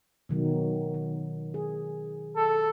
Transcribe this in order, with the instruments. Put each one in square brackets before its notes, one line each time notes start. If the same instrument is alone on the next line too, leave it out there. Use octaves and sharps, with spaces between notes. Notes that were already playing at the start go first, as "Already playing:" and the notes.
[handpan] B2 D#3 F#3
D#3
G#4
[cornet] A4